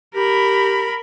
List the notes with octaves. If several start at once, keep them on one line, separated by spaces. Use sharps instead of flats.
G4 A#4 B5